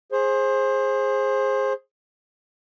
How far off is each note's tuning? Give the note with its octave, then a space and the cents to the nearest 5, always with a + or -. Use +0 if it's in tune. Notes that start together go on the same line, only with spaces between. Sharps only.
G#4 +0 C5 +20